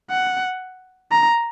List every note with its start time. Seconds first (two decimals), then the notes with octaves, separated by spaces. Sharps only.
0.10 F#5
1.12 A#5